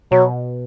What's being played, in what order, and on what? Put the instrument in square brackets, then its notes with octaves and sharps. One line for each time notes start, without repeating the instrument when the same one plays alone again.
[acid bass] B2 [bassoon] F#3